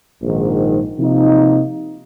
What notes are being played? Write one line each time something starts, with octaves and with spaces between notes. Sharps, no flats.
A#1 G#2 D#3
C3 F3 A#3 D#4